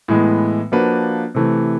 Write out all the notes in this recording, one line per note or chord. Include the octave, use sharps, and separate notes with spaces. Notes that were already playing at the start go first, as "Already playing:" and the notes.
A2 E3 G#3 B3
F3 A#3 D4 F#4 B4
C3 E3 A3